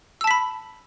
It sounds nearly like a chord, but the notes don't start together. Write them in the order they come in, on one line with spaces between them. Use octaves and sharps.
E6 A5 B6 B5